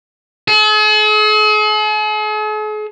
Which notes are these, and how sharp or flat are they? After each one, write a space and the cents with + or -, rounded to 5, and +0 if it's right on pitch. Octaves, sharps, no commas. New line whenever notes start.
G#4 +45